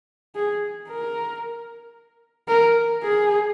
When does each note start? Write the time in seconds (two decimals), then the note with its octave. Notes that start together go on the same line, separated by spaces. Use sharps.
0.35 G#4
0.89 A#4
2.48 A#4
3.03 G#4